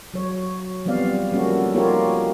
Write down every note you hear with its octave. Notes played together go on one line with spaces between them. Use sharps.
F#3 C#5
F3 G3 B3 C4 D5 F5
F3 G3 A3 A#3 C#4 F#4
A#3 D#4 F4 G4 A#4 C#5